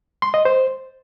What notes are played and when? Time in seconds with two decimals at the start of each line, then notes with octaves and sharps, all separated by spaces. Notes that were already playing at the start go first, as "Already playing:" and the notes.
0.22 C6
0.34 D#5
0.45 C5